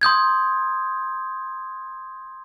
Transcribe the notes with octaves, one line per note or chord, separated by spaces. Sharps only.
C6 D#6 G6 G#6